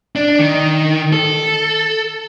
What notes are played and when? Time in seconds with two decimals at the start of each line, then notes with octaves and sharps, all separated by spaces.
0.16 D4
0.39 D#3
1.13 A4